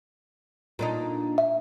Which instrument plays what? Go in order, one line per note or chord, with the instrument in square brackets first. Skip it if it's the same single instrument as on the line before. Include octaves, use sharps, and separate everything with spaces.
[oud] A#2 D4 D#4
[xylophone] E5